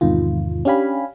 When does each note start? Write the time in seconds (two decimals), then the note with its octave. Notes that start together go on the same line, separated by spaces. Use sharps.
0.01 E2 G#2 C3 D#3 F4
0.65 C#4 D4 G4 F5 G#5 B5